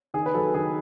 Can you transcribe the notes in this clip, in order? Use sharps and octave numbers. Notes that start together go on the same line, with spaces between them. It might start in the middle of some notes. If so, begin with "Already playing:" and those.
D#3 G#4
B4
F#3 A4
D#3 G#4